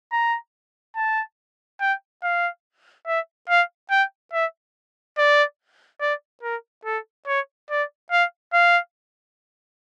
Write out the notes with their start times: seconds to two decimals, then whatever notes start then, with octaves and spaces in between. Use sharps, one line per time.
0.12 A#5
0.96 A5
1.81 G5
2.23 F5
3.07 E5
3.49 F5
3.91 G5
4.33 E5
5.18 D5
6.01 D5
6.43 A#4
6.85 A4
7.27 C#5
7.70 D5
8.12 F5
8.53 F5